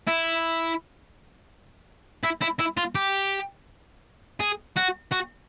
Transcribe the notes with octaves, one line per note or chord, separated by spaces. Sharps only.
E4
E4
E4
E4
F4
G4
G#4
F#4
F#4